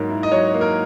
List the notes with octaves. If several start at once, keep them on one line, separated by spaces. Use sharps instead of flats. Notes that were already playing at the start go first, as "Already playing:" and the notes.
Already playing: G#2 F#3 A#3
E4
D#5
F#3 C#5
A#3
A#4